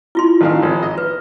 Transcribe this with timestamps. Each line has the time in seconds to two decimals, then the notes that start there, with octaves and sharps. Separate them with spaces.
0.15 E4 F4 C6
0.41 A1 D#3 F5
0.63 G#1
0.83 D#5
0.98 B4